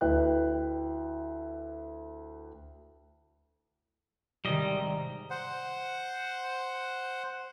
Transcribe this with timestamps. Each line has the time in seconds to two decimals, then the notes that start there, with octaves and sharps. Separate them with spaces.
0.01 D2 E4 B4 G5 F#6
4.45 G#1 C3 D#3 G3 D#5
5.30 C5 F#5